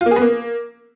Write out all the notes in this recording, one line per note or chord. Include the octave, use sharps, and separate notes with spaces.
F4
A#3
G#4
B3
A#3